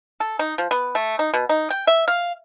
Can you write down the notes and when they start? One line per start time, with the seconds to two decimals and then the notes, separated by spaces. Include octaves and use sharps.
0.20 A4
0.39 D#4
0.58 F3
0.71 B3
0.95 A3
1.19 D#4
1.33 B2
1.49 D#4
1.70 G5
1.87 E5
2.08 F5